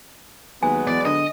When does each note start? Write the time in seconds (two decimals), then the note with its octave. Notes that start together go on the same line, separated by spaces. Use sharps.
0.63 D#2 F#3 G#3 B3 G#5
0.87 E2 D5
1.05 D3 D#5